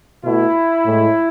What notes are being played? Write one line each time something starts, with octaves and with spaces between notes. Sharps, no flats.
B2 A3 E4
A2 G#3